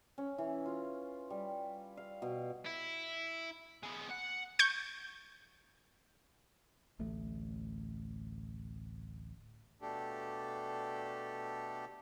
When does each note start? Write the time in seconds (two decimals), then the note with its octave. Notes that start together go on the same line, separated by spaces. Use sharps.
0.18 C#4
0.38 E3
0.66 F4
1.30 G3
1.97 F5
2.22 B2
2.66 E4
3.83 G#3 B3
4.10 F#5
4.59 C#6 G6 C#7
6.99 D1 A1 A3
9.82 B2 A3 D4 G4 A4